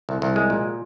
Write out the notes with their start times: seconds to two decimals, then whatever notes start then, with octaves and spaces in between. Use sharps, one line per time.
0.09 C2
0.22 C2
0.36 G#3
0.50 A#2